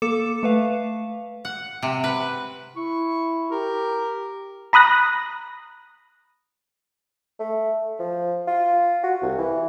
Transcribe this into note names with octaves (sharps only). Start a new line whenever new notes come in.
A#3 A4 D6 C#7 E7
A3 B4 F5
F#5
C3
B4
E4 C#6
G4 A#4
A#5 B5 D#6 F#6 A#6
A3
F3
F4
F#4
C2
E3